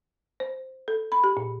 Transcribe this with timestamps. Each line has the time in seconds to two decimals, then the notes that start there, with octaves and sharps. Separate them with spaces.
0.40 C5
0.88 A4
1.12 B5
1.24 G4
1.37 A#2